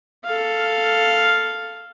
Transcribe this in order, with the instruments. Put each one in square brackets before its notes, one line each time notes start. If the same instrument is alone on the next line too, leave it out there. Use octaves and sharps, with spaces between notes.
[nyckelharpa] A4 F5